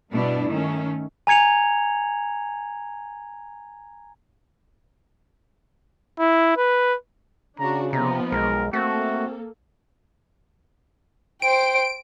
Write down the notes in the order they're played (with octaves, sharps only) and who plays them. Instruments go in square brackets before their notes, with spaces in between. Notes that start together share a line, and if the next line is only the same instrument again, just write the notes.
[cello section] G2 B2 B3 D4 E4
D#3 A3 C#4
[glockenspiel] G#5 A#5 G#6 C#7 F7
[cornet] E4
B4
[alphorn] C#3 [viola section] D4 F#4 [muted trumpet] A#5
[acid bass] C3 [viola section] F3 B3 D#4 [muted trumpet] A#5
[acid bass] B1 [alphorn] G#3 [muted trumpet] A#4
[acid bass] A3 [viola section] A#3 A4 [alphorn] C4 [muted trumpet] F#4
[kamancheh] C5 G5 [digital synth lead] D7